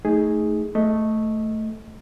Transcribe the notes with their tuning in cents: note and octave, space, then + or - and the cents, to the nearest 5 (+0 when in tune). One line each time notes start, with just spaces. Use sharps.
A3 +0 D#4 +20 G#4 +0
A3 +0 D#5 +15